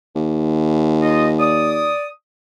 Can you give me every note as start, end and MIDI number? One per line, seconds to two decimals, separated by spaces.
0.16 1.92 39
1.02 1.28 63
1.02 1.28 65
1.02 1.28 75
1.40 2.07 74
1.40 2.07 87